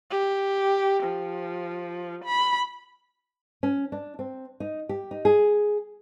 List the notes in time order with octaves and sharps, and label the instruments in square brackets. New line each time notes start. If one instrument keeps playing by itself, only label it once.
[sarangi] G4
F3
B5
[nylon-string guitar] C#4
D4
C4
D#4
G4
D#4
G#4